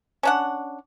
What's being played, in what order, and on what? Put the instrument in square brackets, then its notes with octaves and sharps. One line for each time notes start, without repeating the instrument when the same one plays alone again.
[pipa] C#4 D4 F#5